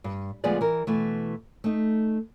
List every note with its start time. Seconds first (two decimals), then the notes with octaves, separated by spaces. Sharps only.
0.04 G2
0.44 D2 F3 G#3 B3 G#4 D5
0.61 E3 A#4
0.87 B2 E3 A3
1.64 A3 D#4